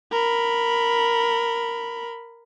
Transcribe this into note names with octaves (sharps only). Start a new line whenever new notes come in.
A#4 B5